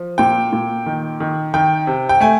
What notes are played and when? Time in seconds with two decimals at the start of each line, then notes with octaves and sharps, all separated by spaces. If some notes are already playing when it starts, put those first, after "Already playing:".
Already playing: F3
0.18 A#2 G5
0.52 A#2
0.86 D#3
1.20 D#3
1.54 D#3 G5
1.87 C3
2.09 G5
2.20 A3 G#5